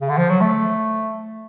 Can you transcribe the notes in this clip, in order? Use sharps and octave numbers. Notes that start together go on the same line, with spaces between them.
C#3
D3
F3
F#3
A3